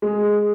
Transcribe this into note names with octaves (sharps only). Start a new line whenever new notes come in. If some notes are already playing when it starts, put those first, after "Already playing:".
G#3